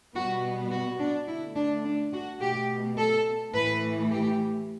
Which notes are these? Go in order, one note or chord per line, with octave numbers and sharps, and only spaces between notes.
B2 G3 B3 F#4
F#4
D4
D3 A3 E4
D4
D4
F#4
B2 A3 G4
A4
A2 E3 A3 B4
G4